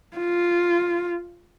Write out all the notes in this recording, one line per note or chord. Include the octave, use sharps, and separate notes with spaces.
F4